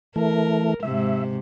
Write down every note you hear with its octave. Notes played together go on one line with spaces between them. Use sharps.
E3 A3 A#4
G#2 C3 E5